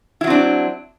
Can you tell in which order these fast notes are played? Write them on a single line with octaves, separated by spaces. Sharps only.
E4 F#3 C4 D4